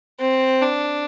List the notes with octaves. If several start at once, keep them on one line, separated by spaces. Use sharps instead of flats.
C4
D4